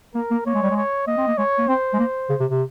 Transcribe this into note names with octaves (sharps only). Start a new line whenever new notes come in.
A#3 A#4
A#3
A#3 C#5
G#3
G3
G#3
C#5
A#3 D#5
C4
A#3
G#3 C#5
A#3
C4 C5
G#3
A#3
C#3
C3
C3